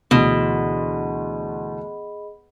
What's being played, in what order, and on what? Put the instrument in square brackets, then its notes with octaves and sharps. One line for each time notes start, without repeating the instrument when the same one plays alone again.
[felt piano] D2 E3 [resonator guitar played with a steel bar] B2 [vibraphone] G#4 D#5 B5